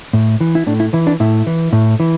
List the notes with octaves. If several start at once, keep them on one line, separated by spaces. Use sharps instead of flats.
A2
E3
E4
A2 D4
E4
E3 E4
D4
A2 E4
E3
A2
E3